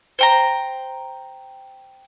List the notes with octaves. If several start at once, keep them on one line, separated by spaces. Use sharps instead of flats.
C5 G5 A#5